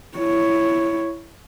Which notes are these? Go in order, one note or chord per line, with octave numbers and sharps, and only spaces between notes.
E4 C#5